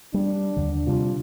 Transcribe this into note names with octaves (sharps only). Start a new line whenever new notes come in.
G3 D4
D#2 D3
C3 G3 D4 F4